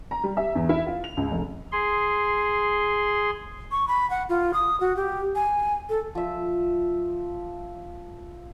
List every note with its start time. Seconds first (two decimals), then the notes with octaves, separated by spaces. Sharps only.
0.11 A#5
0.24 G3
0.37 E5
0.55 E2
0.69 E4
0.86 F4
1.04 F7
1.17 C#2
1.31 F1
1.72 G#4 C6
3.71 C#6
3.88 B5
4.10 F#5
4.29 F4
4.54 D#6
4.80 F#4
4.96 G4
5.35 G#5
5.89 A4
6.15 F3 E5